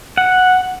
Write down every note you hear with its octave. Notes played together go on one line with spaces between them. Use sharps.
F#5